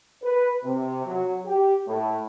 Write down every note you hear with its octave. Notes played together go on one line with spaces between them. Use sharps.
B4
C3
F#3
G4
A2